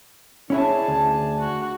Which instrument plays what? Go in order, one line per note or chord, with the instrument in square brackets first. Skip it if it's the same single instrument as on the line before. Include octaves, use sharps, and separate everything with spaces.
[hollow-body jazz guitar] C#4 E4 C#5 [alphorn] D4 [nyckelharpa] G#4 A5
[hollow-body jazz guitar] D2
[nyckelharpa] F#4